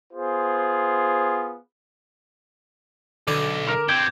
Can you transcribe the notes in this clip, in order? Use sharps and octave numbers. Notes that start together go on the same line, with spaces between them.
B3 F4 G#4 C5
B1 D3 D5 G#5 D6
A#4
G2 C4 G5 D6 G6 G#6